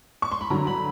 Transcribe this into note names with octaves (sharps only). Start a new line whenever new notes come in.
C#6
C6
B5
G2 D3 F#3 A#5
B5